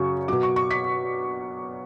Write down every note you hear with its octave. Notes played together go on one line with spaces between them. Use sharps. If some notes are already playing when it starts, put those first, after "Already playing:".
Already playing: F#2 C#3 F#3 C#6
B2 F#3 D6
C#6
C#6
B6